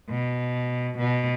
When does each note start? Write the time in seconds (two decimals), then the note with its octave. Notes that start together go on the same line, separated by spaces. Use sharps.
0.10 B2
0.98 B2